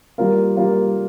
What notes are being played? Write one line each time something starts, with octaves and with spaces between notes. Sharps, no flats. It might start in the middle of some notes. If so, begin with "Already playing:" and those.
G3 A#3 F4 A#4
G3 A#3 F4 A#4